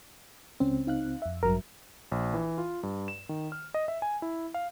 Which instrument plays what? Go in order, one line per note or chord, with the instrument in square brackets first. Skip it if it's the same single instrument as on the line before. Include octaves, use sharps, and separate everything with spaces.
[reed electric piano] C#2 C4 [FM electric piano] C#4
[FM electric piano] D#4 F5 F#6
F2 E5
[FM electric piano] A1 G2 F#3 [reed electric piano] A#4
[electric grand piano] A#1
E3
F4
G2
E7
D#3
F6
D#5
E5
G#5
E4
F5